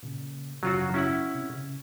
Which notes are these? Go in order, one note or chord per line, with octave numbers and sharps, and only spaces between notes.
A#2 C#3
G#1 F#2 C#3 F#3 F4 F#4
C#4 E4 F#5
C3
C#3